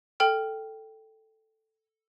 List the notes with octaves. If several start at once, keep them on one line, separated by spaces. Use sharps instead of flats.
A4 G5 F6